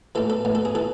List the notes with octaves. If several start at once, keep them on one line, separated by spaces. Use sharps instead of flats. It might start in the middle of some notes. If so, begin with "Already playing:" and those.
A2 E3 A4
A4
A2 E3
A4
G#4
E3 A4